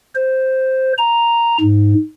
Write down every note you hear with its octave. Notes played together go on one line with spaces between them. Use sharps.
C5
A#5
G#2